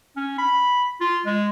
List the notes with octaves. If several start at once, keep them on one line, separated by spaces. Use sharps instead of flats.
C#4
B5
F4
G#3